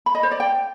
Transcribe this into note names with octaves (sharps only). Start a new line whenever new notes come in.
B5
D#5
C5
D5
G5